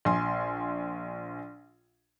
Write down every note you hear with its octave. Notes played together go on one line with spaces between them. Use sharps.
A#1 G#5 C6